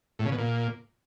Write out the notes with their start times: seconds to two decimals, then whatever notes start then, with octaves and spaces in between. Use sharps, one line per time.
0.19 A2
0.25 C#3
0.32 B2
0.38 A#2